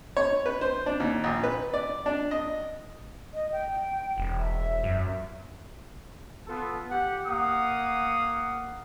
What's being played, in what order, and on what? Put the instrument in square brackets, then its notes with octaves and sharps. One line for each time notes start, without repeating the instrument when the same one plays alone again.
[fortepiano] C#5
B4
C5
D4
D#2
A#1
B4
D5
D4
D#5
[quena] D#5
G5
[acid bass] E1
[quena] E5
[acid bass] F#2
[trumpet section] B3 F4 A4
G4 F#5
A#3 F5 F#5 D#6